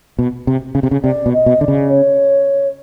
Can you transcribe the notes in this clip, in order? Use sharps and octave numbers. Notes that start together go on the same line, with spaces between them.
B2
C3
C#3
C3
C#3
C3 D5
B2
D#5
B2
D3 D5
C#3
C#5